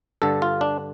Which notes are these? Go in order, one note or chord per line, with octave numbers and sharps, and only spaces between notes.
G2 D3 A4
F4
D4